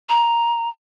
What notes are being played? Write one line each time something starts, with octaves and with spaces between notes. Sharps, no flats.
A#5